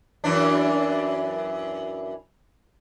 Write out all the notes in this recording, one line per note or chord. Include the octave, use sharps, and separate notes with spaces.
F#2 E3 D4